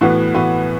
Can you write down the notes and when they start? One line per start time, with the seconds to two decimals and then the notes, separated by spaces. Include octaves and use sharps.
0.01 A2 E3 B3 F#4
0.34 A2 E3 B3 F#4